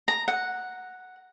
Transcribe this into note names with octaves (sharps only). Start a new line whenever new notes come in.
A#5
F#5